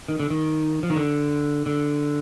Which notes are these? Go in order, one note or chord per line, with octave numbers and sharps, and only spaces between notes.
D#3
D3
D#3
F3
D#3
D3
D3